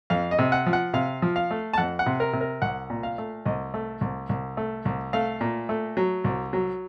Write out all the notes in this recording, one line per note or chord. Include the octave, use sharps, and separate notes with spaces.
F2 F5
D#5
C3
F#5
F3
F#5
C3 F5
F3
F5
A3
A5
F2 F#5
F#5
C3
A#4
C3
A#4
C2 F#5
A#2
F5
A3
C2 D#5
A3
C2
C2
A3
C2
A3 F5
A#2
A3
F#3
C2
F#3